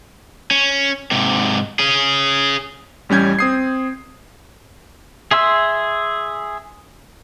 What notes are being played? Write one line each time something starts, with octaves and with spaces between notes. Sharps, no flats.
C#4
G#2 C3
C#4 G#4
A1 G3 C#4 G6 G#6
C4 D#6 C7
G#4 E5 C6 E6